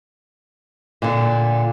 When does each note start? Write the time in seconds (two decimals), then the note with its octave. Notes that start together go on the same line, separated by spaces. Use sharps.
1.02 A#2 D3